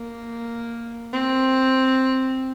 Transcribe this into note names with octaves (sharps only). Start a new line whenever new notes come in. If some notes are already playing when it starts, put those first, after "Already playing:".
Already playing: A#3
C4